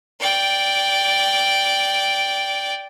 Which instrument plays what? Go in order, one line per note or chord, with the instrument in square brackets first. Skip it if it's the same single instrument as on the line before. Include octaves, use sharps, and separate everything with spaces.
[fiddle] D5 G5